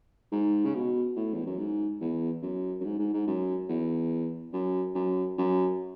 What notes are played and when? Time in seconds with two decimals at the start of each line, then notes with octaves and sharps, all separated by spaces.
0.32 G#2
0.65 C#3
0.75 B2
1.16 A2
1.34 E2
1.46 F#2
1.58 G#2
2.01 E2
2.43 F#2
2.80 F#2
2.85 G#2
2.99 G#2
3.14 G#2
3.27 F#2
3.69 E2
4.53 F#2
4.95 F#2
5.38 F#2